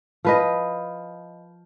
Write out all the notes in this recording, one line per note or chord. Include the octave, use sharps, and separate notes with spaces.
F3 B4 D#5